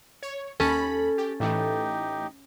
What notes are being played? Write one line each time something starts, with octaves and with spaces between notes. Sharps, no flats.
C#5
D#2 C#4 A4 B5
G4
A2 E3 A3 D#4 G4